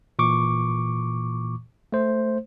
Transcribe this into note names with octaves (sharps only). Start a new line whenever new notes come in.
A#2 E3 C#6 D6
A3 C5